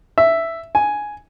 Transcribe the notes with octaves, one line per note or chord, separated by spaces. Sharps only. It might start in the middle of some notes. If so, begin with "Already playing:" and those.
E5
G#5